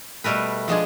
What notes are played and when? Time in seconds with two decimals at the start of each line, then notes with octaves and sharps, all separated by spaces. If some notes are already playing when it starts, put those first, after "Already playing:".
0.24 B2 G3 A3 A#4 B4
0.68 F3 G#3 D4 G#4